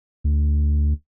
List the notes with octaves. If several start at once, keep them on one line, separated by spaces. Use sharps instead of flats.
D2